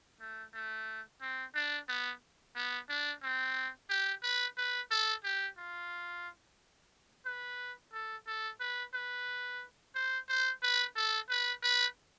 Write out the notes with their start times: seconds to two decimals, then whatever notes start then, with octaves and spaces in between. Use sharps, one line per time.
0.21 A3
0.54 A3
1.21 C4
1.55 D4
1.89 B3
2.56 B3
2.89 D4
3.23 C4
3.90 G4
4.23 B4
4.58 B4
4.91 A4
5.24 G4
5.58 F4
7.26 B4
7.93 A4
8.27 A4
8.61 B4
8.94 B4
9.95 C5
10.28 C5
10.63 B4
10.96 A4
11.30 B4
11.63 B4